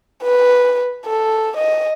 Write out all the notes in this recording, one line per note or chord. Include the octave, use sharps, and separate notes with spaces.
B4
A4
D#5